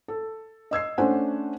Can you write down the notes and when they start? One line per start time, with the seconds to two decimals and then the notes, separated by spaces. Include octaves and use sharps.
0.08 A4
0.71 D#5 E6 G#6 C7
0.98 A3 C#4 D4 C5 F#5 G#5